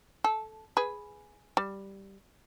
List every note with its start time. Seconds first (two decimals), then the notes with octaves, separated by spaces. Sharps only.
0.24 A4
0.77 G#4 B4
1.57 G3